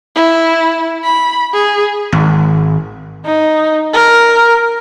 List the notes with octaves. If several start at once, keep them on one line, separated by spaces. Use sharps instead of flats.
E4
B5
G#4
G#1
D#4
A#4